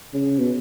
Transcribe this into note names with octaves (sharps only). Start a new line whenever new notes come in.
C#3
B2